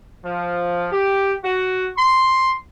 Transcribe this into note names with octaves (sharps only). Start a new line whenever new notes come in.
F3
G4
F#4
C6